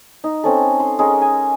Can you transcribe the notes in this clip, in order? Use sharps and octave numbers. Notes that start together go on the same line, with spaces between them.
D#4
C4 C#4 A4
C6
G#3 C#4 A#4
G#5